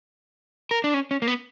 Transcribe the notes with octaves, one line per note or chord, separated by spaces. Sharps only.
A#4
D4
C#4
C#4
A#3
B3